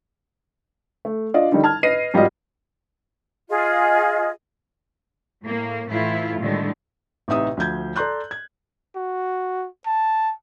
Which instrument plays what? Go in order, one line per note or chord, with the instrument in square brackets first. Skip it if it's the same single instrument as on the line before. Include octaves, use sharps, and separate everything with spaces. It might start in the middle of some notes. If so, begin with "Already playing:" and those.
[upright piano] A3
D4 F4 D5 D#5 F5
D3 D#3 G3 D#4
A5 F6 G#6
B4 D#5 A#6 C7 D#7
G#1 G3 F4 F#4 D#5
[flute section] F4 G#4 D#5
[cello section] A2 A#3
A2 E3 A3 E4 F4
A2 D3 D#3 G3 G#3
[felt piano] A1 C3 D#4 E5 D#6
D2 F3 G6 G#6
A4 D5 A#5 C6 F#6 G6
G#6
[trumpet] F#4
A5